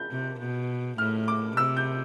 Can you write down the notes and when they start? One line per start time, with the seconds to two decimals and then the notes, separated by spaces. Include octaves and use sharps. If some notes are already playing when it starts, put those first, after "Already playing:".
Already playing: G6
0.11 C3
0.39 B2
0.98 A2 F6
1.28 D6
1.57 C3 E6
1.77 G6